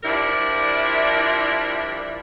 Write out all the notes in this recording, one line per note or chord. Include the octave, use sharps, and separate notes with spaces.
F3 G3 D4 E4 A#4